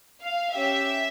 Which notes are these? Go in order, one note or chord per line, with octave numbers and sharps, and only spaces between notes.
F5
C#4 G4 E5